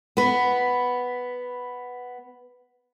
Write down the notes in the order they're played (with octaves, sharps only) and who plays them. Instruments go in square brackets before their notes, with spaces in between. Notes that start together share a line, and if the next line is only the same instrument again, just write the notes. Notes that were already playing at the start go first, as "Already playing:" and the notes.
[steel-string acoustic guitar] B3 B4